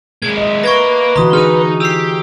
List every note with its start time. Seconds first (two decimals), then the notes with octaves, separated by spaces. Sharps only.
0.22 G#3 A#3 G#6
0.37 D#5 E5
0.64 A#3 B4 C#6 G#6 A#6
1.16 D3 E3 F#4 A#5 C6 D#6
1.33 D#4 G#4 F6 D#7
1.81 E4 G4 E6 C7